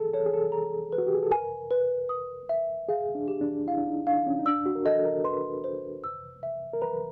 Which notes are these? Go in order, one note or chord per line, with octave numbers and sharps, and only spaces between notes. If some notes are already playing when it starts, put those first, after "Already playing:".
Already playing: G#4 A4
A4 C#5
G#4
A4
A#5
B4
F#4
G4
G#4
A4
A#4 G#5
B4
D#6
E5
G#4 F5
D4
G4
D4
E4 F5
D4
D#4
D4 F5
C#4
D#4
D4 E6
F#4
A#4
A4 D#5
A#4
B4 C6
C5
E6
E5
A#4
B4 A#5